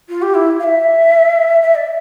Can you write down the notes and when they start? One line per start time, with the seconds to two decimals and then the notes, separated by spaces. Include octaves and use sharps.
0.09 F4
0.22 G4
0.34 E4
0.60 F5
0.64 E5
1.62 E5
1.75 D5